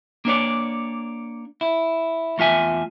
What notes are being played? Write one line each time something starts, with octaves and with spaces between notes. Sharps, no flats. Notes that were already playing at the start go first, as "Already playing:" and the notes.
A#3 D4 C#5 D5
E4
E2 A3 F4 E5 G#5